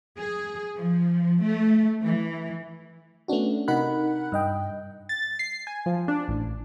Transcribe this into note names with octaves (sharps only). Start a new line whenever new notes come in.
G#4
F3
A3
E3
A3 B3 C#4 D4 F#4
C3 D#4 A#4 F#5 B5 F#6
G2 D#5 G5
A6
C7
G#5
F3
D4
A1